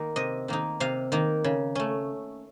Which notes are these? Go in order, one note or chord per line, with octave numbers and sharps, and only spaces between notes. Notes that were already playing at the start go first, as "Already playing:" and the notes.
Already playing: D#3 A#3 D#4
C3 D#5
D#3 A#3 D#4
C3 F5
D#3 A#3 D#4
C#3
A3 C#4